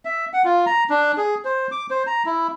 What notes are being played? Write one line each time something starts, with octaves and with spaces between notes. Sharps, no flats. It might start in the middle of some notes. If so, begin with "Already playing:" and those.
E5
F#5
F4
A#5
D4
G#4
C5
D6
C5
A#5
E4